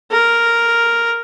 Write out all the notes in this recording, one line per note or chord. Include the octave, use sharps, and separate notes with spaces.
A#4